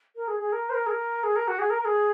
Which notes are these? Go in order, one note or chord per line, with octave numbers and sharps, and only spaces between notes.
A#4
G#4
G#4
A#4
C5
A#4
G#4
A#4
G#4
A#4
F#4
G#4
A#4
A#4
G#4